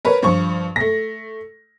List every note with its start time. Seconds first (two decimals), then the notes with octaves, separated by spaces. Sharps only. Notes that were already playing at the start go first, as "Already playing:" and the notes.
0.05 A#4 B4 C#5
0.22 G2 F3 C#6
0.76 A3 A#6